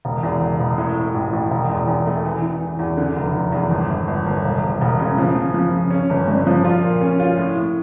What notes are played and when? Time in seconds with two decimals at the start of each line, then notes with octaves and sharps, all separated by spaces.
0.05 E1
0.23 E2
0.41 E1
0.59 E1
0.78 A2
0.96 A2
1.15 A1
1.33 A1
1.51 E1
1.70 E2
1.88 E2
2.06 A3
2.25 E3
2.42 E3
2.60 E3
2.79 E2
2.97 D3
3.17 F1
3.34 F1
3.52 E2
3.71 G1
3.90 G1
4.07 G1
4.26 G1
4.45 E1
4.63 E1
4.81 E1
4.99 C#3
5.18 F3
5.36 F3
5.54 F3
5.73 C#3
5.91 C#4
6.10 G1
6.28 G2
6.47 F3
6.64 F4
6.82 A#2
7.01 C#4
7.19 F4
7.38 A2
7.56 A2